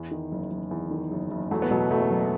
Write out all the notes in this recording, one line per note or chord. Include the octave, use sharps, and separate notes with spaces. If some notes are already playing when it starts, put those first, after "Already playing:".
Already playing: E2
D#3
F#1
F#1
E2
D#3
F#1
F#1
E2 F#3 A3
B3
B2 F#3 A3
F#1 F#3 A3
F#1